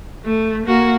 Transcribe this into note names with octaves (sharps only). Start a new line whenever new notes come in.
A3
A#3 F#4